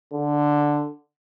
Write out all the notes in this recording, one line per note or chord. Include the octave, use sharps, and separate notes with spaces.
D3